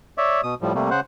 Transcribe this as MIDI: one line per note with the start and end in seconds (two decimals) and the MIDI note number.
0.18 0.41 73
0.18 0.41 74
0.18 0.41 76
0.43 0.55 47
0.43 0.55 87
0.62 0.73 45
0.62 0.73 53
0.62 0.73 55
0.75 0.90 48
0.75 0.90 55
0.75 0.90 57
0.75 0.90 58
0.91 1.00 49
0.91 1.00 72
0.91 1.00 78